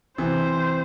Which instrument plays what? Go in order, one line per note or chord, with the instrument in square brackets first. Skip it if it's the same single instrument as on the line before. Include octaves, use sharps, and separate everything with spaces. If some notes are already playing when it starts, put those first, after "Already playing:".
[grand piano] C3 E3 [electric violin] C5